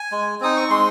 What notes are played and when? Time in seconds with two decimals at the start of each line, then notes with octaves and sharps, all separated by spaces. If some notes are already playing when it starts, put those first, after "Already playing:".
Already playing: G#5
0.12 G#3
0.40 C4 D#4 D#6
0.57 C#6
0.70 G#3 C6